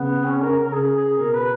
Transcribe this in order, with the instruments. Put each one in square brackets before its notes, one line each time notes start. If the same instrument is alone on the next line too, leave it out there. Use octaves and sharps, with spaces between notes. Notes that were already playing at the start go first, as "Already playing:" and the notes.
Already playing: [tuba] C#3 [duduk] B3
[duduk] C#4
A#4
A#4
A#4
[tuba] C#3 [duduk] G#4
[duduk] G#4
[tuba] B2 [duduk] A#4
[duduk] B4